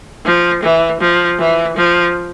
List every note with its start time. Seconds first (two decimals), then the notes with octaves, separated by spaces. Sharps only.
0.25 F3
0.63 E3
1.00 F3
1.39 E3
1.76 F3